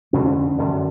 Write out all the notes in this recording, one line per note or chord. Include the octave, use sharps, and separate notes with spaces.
F2 D3 C#4
F#2 D3